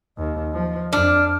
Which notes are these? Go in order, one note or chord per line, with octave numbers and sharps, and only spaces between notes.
D#2 D#5
F3
F2 D4 F6